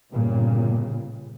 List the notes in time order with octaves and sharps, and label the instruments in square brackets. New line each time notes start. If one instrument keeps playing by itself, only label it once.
[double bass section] G1 A#2 C#3